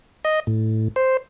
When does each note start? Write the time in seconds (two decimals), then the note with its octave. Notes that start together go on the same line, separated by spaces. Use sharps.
0.25 D#5
0.47 A2
0.96 C5